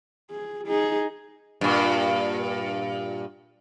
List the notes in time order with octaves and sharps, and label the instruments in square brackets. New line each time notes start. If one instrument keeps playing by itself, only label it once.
[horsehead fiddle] G#4
D#4 G#4
[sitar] G2 A#2